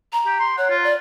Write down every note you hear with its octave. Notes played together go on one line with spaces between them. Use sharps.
A#5
G4
C6
C#5 F#5
F4
D5